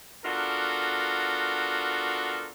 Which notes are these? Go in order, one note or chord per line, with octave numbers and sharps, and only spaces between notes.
B3 D4 F4 F#4 A4 A#4